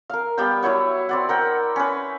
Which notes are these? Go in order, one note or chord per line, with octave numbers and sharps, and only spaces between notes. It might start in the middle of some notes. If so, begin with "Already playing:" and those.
A#4 F5
G3 B3 F5 G5
F#3 E4 C#5 F#5
C4 D5 F#5
A#4 F#5 G5
C#4 B4